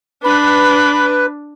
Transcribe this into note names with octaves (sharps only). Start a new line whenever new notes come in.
D4 B4 B5